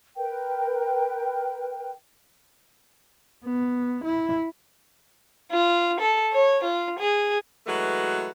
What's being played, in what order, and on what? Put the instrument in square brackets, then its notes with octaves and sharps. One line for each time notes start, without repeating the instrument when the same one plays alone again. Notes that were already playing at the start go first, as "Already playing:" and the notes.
[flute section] A#4 B4 G5
[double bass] B3
E4
[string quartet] F4
A4
C#5
F4
G#4
[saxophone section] E3 F#3 G#3 A3 F#4 B4